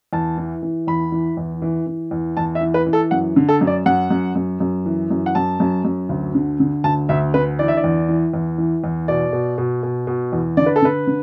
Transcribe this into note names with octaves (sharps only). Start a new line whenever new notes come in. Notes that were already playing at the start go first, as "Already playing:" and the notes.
E2 A5
E3
E3
E2 B5
E3
E2
E3
E3
E2
E2 A5
E5
E3
B4
E3
A4
F#2 F#5
D3
A4
F#2
D5
F#2 F#5
F#2
F#2
F#2
E3
F#2
F#5
F#2 A5
F#2
F#2
D2
D3
D3
D2 A5
D2 E5
D3 B4
E3 D5
E5
D5
E2
E3
E2
E3
E2
B2 D5
B2
B2
B2
B2
E2
D3 D5
B4
A4
D3 B4
D3